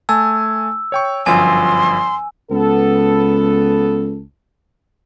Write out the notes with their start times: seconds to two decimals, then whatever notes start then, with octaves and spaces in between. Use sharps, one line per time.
0.09 A3 G#5 A5 E6
0.92 C#5 G5 C#6
1.26 G1 F#2 F3 G#5 C6
2.51 C#2 B3 A4